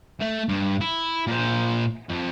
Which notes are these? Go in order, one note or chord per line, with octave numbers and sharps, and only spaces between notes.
A3
G2
E4
A#2 C5
F2